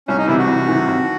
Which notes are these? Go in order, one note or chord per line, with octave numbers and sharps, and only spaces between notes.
C2 C#4
D#4
C3 E3 E4
F#4
C2
C3 E3
D#2